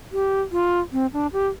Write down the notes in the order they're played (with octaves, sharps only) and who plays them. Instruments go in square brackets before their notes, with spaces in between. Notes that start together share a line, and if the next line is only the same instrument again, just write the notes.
[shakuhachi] G4
F4
C4
D4
G4